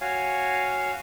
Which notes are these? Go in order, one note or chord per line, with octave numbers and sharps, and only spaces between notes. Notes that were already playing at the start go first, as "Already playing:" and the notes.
F#4 C#5 F5 G#5